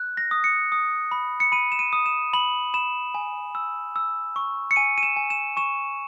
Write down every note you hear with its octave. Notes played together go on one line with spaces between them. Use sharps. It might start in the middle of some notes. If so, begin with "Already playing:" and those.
Already playing: F#6
A#6
D#6
C#7
D#6
B5
C#7
B5 D#7
E7
D#7
D#6
E7
B5 F#7
B5 E7
G#5
E6
E6
C#6
C#7
G#5 D#7
D#7
E7
G#5
E7
C#6 E7